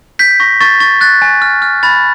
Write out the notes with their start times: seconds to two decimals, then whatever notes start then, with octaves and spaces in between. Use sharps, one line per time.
0.19 G6 B6
0.40 C#6 A#6
0.61 C#6 A6
0.80 C#6 A6
1.01 F#6 A6
1.22 G#5
1.42 F6
1.62 F6
1.83 B5 A6